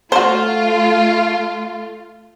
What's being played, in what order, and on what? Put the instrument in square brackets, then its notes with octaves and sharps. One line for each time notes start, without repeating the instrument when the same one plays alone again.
[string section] A3 F4 [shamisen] F#4 C5